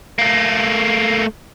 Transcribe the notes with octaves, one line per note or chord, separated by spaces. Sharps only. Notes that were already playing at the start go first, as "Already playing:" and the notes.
A3 A#3